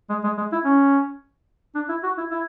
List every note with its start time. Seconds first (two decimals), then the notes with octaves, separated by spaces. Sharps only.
0.10 G#3
0.24 G#3
0.38 G#3
0.52 E4
0.65 C#4
1.75 D4
1.89 E4
2.03 F#4
2.18 E4
2.31 E4